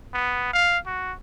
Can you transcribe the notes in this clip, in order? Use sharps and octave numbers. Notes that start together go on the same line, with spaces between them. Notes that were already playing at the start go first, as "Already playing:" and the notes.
B3
F5
F#4